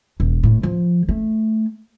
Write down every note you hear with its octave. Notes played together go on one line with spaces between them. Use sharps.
E1
A2
F3
A3